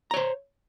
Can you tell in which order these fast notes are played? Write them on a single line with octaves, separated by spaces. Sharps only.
A#5 C#5 C5